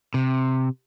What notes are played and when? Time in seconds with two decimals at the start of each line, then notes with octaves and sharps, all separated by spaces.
0.14 C3